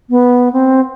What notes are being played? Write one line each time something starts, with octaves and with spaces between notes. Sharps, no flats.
B3
C4